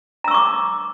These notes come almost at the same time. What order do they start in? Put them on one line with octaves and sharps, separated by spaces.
A#5 E6 C#6 D6